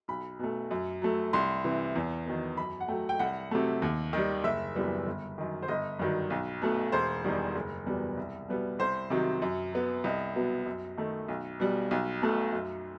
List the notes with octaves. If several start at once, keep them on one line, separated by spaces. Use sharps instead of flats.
B1 B5
B2 A3
F#2
F#3 A3
C2 C6
C3 E3
E2
D#3 F#3 B3
F#2 B5
F#5
F#3 A3 G5
G5
C2 F#5
C3 F#3 A3
D#2
D#3 G3
F#1 E5
F#2 E3 G3 B3
G1
F#2 D#3
C5
G1 D#5
G2 D#3 F#3
B1
B2 A3
E1 C5
E2 D#3 G3
F#1
E2 B2 G3 B3
C2
B2 G3 B3
C2 C5
C3 D#3 F#3
F#2
F#3 B3
C2 D#5
B2 F#3 B3
F#2
D#3 A3
B1
B2 G3
B1
B2 A3
F#2